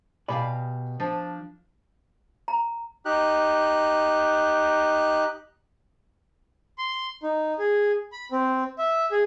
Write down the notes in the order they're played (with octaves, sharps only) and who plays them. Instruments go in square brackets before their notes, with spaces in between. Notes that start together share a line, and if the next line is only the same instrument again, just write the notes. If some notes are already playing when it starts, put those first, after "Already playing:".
[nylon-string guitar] B2 G4 F5 [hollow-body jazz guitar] D5 G#5 B5
[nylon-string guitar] F3 D4
[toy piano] A#5
[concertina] D#4 G4 F#6
[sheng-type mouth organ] C6
D#4
G#4
B5
C4
E5
G#4